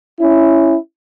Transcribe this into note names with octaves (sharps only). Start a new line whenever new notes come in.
C#4 E4